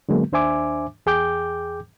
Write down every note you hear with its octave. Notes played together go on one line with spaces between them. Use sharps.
D3 F#3 G#3 A#3 B3
D#2 D4 C5 E5 G#5 D6
E2 G#4 G5 D6 G6